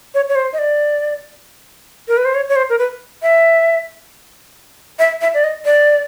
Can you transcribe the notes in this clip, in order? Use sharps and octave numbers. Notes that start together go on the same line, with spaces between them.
C#5
C#5
C5
D#5
D5
A#4
B4
C5
C#5
C#5
C5
A#4
B4
E5
E5
E5
D5
D#5
D5